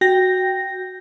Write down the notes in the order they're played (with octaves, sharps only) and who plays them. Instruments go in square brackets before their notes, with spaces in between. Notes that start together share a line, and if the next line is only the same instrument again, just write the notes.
[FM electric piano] F#4 G5 G6 A#6